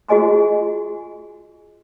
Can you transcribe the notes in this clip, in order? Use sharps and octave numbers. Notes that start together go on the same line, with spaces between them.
F4 F#4 G#4 D#5 G#5 C6